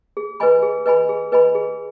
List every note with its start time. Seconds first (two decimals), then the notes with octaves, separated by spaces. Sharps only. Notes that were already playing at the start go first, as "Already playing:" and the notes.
0.17 G#4
0.40 B4 D#5 G#5 B5
0.63 G#4
0.86 B4 D#5 G#5 B5
1.09 G#4
1.32 B4 D#5 G#5 B5
1.55 G#4